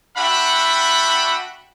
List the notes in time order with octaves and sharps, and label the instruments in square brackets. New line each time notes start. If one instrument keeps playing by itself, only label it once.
[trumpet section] D4 F#4 E5 F#5 G5 B5